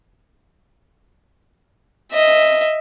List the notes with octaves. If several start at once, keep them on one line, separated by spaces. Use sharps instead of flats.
D#5 E5